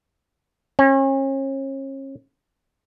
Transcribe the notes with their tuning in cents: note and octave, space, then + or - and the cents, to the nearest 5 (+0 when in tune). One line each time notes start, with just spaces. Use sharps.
C#4 -40